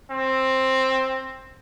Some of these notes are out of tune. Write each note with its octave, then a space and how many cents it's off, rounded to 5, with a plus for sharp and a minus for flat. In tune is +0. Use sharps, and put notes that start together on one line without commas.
C4 +10